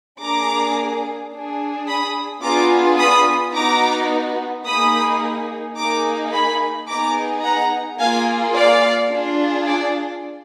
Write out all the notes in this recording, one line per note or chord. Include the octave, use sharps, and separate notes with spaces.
A#3 D4 G#4 A#5 D6
D4 G#4
B5 D#6
B3 D4 F4 G#4 A#5 D6
B5 D#6
B3 D#4 F#4 A#5 D6
A#3 D#4 G#4 B5 D#6
A#3 D#4 G#4 A#5 D6
G#5 B5
B3 D#4 G#4 A#5 D6
F#5 A#5
A#3 F4 G#4 F5 G#5
D5 F5
D4 F4 G#4
D5